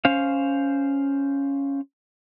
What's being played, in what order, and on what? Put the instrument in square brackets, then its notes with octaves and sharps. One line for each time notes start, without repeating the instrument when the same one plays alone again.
[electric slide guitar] C#4 C5 F5